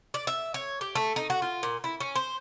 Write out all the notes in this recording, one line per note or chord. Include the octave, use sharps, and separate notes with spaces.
D5
E5
C#5
G4
A3
D#4
F#4
F4
A#2
E4
C#4
C5